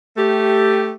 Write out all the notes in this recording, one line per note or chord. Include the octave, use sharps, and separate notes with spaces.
A3 G4